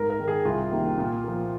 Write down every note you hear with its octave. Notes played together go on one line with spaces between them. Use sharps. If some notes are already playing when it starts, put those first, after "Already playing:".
Already playing: G#2 A#4
A#4
D#3 G#3
G#4
C2 F4
C3 D#3 A#3
A#2
F3 A#3